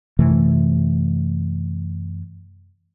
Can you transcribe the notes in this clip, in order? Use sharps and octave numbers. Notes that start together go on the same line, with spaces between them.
F#2 C3 E3 A3